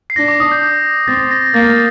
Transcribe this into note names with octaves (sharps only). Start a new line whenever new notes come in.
C7
D4 A#6
D6
D#6
G6
C4 A6
A#6
A#3 A6
A#6